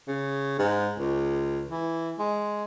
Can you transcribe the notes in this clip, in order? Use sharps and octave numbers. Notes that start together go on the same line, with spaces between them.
C#3
G#2
C#2
E3
G#3